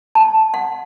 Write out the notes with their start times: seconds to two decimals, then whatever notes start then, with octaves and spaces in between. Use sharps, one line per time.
0.15 A5
0.54 F#5